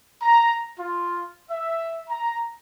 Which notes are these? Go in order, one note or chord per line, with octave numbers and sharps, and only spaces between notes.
A#5
F4
E5
A#5